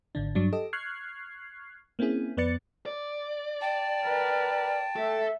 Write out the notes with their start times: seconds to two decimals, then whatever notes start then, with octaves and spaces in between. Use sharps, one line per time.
0.15 G#1 D3 D4
0.35 G2 F#3 D4
0.52 G4 A4 D#5
0.73 C#6 F6 F#6 G#6 C7
1.99 A#3 C4 C#4 E4 G#4
2.37 F2 B3 B4 D5 A6 C#7
2.86 D5
3.61 G5 A5
4.04 A#4 B4
4.96 A3 A4 E5